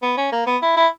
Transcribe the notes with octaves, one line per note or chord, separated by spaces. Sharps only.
B3
C#4
A#3
B3
E4
E4